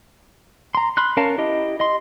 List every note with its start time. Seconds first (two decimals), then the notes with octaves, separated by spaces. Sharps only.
0.75 A#5 C6
0.97 B5 C6 F6 F#6
1.17 C#4 A#4 F5 A5 A#5
1.38 E4 G4 D#5
1.80 D#5 C6